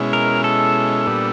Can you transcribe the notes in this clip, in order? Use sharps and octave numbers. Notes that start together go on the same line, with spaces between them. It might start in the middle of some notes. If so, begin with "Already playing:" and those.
Already playing: B2 G#3 C#4 E4
A#4
A4
A#2 G3 B3 D4